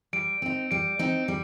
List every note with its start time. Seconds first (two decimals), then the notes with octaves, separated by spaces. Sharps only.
0.13 G3 D7
0.42 C4 D#4
0.71 G3 D7
0.99 C4 D#4
1.28 G3